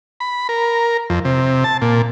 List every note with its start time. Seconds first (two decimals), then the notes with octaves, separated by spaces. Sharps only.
0.20 B5
0.49 A#4
1.10 F2
1.25 C3
1.64 A5
1.82 A#2